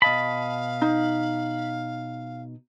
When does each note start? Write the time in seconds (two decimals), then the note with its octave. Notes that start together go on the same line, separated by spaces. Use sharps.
0.02 B2 D#5 F5 A5 B5
0.82 D#4